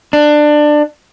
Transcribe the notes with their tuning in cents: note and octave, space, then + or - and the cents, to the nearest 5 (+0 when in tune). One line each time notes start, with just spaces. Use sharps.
D4 +20